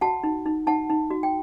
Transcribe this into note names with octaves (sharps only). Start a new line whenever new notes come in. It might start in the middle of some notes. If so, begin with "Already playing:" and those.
F#4 F#5 A5
D#4
D#4
D#4 F#5 A5
D#4
F#4
G5